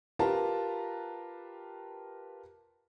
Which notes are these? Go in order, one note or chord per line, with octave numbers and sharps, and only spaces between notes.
F4 G4 A#4 B4 A5 A#5